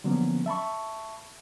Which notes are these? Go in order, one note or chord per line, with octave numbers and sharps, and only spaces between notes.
D3 F3 F#3 A#3 B3 C#4
E5 A5 B5 C#6